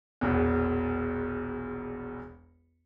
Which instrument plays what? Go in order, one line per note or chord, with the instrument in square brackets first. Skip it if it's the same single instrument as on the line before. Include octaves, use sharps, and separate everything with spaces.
[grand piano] E1 A#1 E2